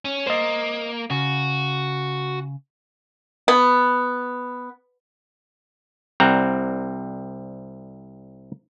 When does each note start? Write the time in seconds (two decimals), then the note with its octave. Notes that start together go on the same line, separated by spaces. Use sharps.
0.05 C#4
0.27 A#3 C5 D#5
1.10 C#3 F#4
3.48 B3
6.20 C2 G3 C4 F#5 A#5